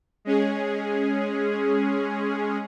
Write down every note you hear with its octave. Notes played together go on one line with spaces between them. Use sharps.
G#3 C#4 G#4